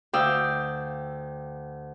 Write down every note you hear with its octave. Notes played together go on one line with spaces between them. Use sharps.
D2 D5 F5 G5 D#6 E6